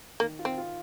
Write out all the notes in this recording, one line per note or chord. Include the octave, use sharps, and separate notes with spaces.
D#3 A#3
F4
C4
F4